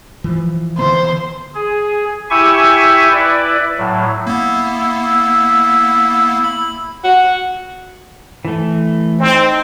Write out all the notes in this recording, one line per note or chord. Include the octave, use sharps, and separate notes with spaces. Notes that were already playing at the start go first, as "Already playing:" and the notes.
E3 F3
D3 E3 B3 C5
G#4
E4 G4 E5 G#5 C#6
E4 B4 D5
A2 F#3
A#3 B3 E4
B5
F#4
E3 A3
C4 D#4